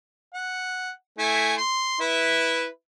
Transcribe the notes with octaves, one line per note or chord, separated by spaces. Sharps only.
F#5
A3 E4 G#5
C6
E4 B4 E5